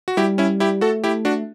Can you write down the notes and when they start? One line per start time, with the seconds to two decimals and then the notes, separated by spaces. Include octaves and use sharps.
0.08 F#4
0.17 G3 E4 G4
0.38 C#4 E4
0.60 E4 G4
0.81 A3 F#4 A4
1.04 E4 G4
1.25 D4 F#4